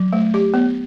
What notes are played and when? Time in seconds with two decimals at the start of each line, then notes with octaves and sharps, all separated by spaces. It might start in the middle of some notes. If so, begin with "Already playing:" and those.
Already playing: F#3
0.13 A3
0.34 G4
0.54 B3